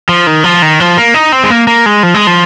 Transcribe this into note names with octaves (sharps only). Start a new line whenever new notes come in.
F3
D#3
F3
D#3
F3
A#3
D#4
C4
G#3
A#3
A#3
G#3
F3
G#3
F3